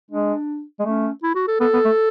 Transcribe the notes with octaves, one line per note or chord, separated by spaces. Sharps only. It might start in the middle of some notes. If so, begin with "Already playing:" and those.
G#3 D4
G#3
A3 C#4
E4
F#4
A4
B3 A4
B3
A3